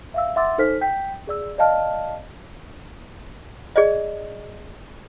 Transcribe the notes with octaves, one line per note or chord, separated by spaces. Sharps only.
E5 F5 E6
E5 F#5 C6 D6 E6 A6
D#4 A4 C5 F6 B6
G5 G6 B6
G#4 D5 E6
D5 D#5 F5 A5 F6
G#4 D5 D#5